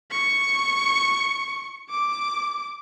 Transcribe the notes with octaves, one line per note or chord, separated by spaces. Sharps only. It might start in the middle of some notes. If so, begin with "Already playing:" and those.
C#6
D6